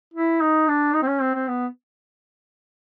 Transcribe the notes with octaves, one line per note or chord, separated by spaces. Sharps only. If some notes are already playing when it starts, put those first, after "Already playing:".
E4
D#4
D4
D#4
C4
C#4
C4
C4
B3